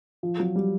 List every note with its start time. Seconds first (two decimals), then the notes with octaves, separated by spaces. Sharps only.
0.23 F3
0.40 F#3
0.56 G3